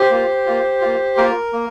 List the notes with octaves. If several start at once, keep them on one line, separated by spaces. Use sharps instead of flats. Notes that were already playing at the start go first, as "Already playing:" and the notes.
Already playing: G4 C5
A#3 F4
A#3 F4
A#3 F4
A#3 F4 A#4
A#3